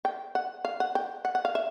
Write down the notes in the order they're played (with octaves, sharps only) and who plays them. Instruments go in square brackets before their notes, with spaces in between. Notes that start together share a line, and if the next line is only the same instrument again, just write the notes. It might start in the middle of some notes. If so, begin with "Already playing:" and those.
[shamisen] G5
F#5
F5
F#5
G5
F#5
F#5
F5
E5